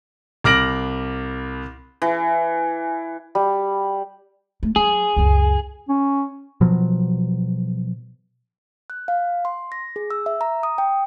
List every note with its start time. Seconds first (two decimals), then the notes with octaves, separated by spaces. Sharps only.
0.44 C2 D6 F6 A#6 D7 F#7
2.02 E3
3.35 G3
4.63 A3
4.76 F#3 G#4
5.16 C#2 F#2
5.89 C#4
6.61 B2 F3 F#3
8.90 F#6
9.08 F5
9.45 C6
9.72 A#6
9.96 G#4
10.10 E6
10.26 E5
10.41 A#5
10.63 D#6
10.78 G5